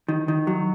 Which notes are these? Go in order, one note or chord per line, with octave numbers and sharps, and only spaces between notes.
D#3
D#3
F#3